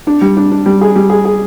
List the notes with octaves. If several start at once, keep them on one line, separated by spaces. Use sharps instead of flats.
D4
G3
D4
D4
G3
G#4
G3
G#4
G#4